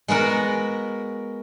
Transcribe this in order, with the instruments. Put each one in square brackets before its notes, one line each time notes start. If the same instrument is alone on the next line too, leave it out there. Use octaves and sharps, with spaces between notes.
[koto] G#3 B3 F#4 A#4